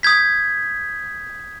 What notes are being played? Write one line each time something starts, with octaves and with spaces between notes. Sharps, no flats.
D#6 G6 G#6 B6